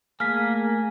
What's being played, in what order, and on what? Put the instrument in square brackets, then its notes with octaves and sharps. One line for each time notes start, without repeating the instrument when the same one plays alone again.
[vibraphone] A3 G#4 [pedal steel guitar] A#3 [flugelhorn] G#5 [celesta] F6 B6